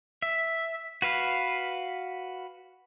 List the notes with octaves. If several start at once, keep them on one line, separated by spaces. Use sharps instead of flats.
E5
F#4 B4 F5